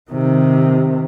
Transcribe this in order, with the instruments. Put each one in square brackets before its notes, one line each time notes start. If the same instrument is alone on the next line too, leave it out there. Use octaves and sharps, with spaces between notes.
[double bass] C3 D#3